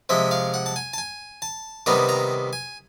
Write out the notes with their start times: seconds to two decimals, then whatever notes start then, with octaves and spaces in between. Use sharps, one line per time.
0.09 C3 F3 G#3 E5
0.31 F5
0.54 F#5
0.66 A5
0.76 G#5
0.93 A5
0.98 G#5
1.42 A5
1.86 C3 D#3 G3 B3 A#5
2.09 A#5
2.53 G#5